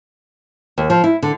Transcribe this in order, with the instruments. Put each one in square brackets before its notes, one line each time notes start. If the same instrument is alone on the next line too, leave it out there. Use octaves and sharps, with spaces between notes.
[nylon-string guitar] D#2
F3
E4
D3